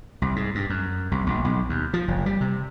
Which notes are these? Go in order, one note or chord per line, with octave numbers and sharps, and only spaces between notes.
C2
G#2
G2
F#2
C2
A#1
B1
D#2
F3
F#1
G3
C3